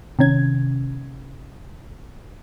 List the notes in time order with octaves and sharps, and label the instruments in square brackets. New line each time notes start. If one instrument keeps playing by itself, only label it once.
[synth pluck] C3 D#3 C#4 G#6